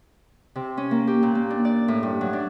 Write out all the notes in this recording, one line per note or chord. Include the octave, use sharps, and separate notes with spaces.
C3
C#4
A#3
G4
A#2
A#3
D4
D5
A2
G2
F#3
D4